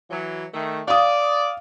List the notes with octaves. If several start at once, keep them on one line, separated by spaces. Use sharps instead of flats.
E3 F#3
D#3 A3
D5 F5 D#6